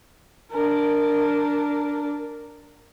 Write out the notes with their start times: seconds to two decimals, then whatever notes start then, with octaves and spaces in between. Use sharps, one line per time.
0.52 D4 A#4